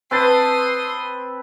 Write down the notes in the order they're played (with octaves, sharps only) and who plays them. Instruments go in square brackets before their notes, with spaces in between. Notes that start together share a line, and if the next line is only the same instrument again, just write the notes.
[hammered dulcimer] C4 B4 A5 [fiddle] C6 D#6